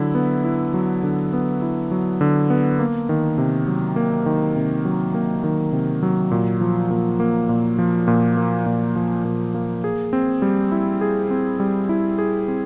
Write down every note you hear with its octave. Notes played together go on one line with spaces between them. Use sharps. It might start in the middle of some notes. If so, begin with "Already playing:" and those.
Already playing: D3 F#3 E4
B3
E4
F#3
D3
B3
E4
F#3
D3
B3
A#3
D#3
C3
F#3
A#3
D#3
C3
F#3
A#3
D#3
C3
F#3
A#2
F3
A#2
A#3
A#2
F3
A#2
A#3
A#2
F3
A#2
A#3
G#4
C4
G3
E4
G#4
C4
G3
E4
G#4
C4